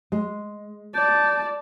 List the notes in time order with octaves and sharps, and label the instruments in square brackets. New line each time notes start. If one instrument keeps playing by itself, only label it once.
[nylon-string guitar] G#3
[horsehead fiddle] D5 A5 [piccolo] G6